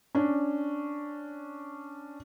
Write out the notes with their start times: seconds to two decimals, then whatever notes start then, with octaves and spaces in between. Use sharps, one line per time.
0.15 C#4 D4